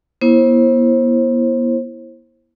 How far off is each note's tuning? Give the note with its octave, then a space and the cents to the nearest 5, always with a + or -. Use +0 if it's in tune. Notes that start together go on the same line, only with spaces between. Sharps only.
B3 -40 E4 +0 C5 +30